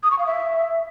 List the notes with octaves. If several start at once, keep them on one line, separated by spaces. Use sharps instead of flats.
D#6
C#6
F5
E5